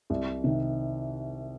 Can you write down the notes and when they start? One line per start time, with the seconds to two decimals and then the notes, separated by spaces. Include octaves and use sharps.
0.10 C2
0.44 C3 D#3